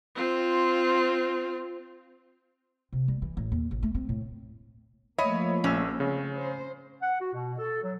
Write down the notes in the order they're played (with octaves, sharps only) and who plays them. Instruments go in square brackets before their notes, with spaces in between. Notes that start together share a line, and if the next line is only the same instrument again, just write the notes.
[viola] C4 F4
[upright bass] C3
G3
E3
A1
D#2
A1
A3
C4
A2
[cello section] F3 A3 A#3 [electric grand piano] C#5 E5 B5 [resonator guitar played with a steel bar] D#5
[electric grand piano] A#1 E6 [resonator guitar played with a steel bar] C#4
[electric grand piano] C#3 [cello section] C4
[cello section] C5
[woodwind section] F#5
F#4
B2
A4
F#3